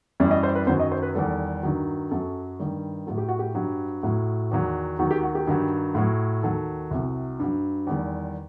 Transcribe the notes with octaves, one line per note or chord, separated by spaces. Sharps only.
F#2 E3 G3
D#5
C5
B4
F#2 D#3 F#3 C5
D#5
C5
B4
E2 D#3 G3 A4
G2 D#3 F#3
F#2 F#3 A4
G2 D#3 G3
A2 F#3 A4
G4
F#4
G4
G2 F#3
A2 F#3
E2 D#3 F#3
D#2 D#3 F#3 F#4
G4
F#4
G4
G2 D#3 F#3
A2 F#3
D#2 D#3 F#3 A4
C2 C3 F#3
G2 F#3
E2 D#3 G3